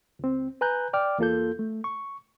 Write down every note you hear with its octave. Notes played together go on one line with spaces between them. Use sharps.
C#2 C4
B4 G#5 A#5 F#6 G6
D5 G5 D6 F6
E2 A#3 F4 A4 G6
A3
C#6